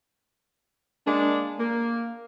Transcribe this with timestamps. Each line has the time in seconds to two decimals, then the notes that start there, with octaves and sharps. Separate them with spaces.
1.06 G#3 A#3 D4
1.59 A#3